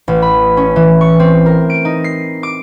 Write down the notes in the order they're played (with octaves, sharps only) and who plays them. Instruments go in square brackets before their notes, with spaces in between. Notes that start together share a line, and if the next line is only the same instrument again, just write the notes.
[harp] A1
B5
C#4
E3
C#6
C4
A#4
D7
D#4
C7
D6